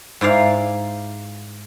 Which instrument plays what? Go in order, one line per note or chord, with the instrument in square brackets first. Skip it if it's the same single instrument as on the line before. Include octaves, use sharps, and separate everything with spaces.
[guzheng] G#2 E4 D5 F5